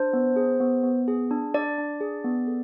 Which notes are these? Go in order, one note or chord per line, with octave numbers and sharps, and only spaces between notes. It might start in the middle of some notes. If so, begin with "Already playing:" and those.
Already playing: D4 C5
B3
G#4
B3
B3
G#4
D4
D4 D5
D4
G#4
B3
A4